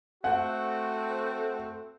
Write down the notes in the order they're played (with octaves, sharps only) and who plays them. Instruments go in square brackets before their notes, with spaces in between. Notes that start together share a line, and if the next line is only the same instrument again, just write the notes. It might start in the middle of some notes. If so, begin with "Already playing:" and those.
[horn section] A3 C4 F#4 [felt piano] F#5